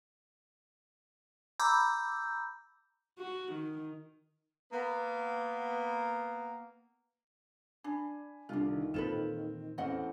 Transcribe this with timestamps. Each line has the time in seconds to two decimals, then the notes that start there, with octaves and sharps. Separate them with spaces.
1.60 A#5 B5 D6 E6 G6
3.19 F#4
3.52 D#3
4.72 A#3 B3
7.84 D4 G#5 B5
8.49 C2 D3 D4 F4
8.65 D#3
8.94 E2 A#2 C4 F4 A4 B4 E7
9.78 E2 A3 C4 C#4 D#5 F#5